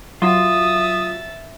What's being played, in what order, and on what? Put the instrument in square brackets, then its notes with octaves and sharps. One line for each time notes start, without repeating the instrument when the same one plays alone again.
[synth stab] F#3 [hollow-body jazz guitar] F4 [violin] E5 A6 [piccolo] D#6